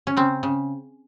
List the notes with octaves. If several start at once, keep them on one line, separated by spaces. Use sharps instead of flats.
C#4
C#3 C4
C#3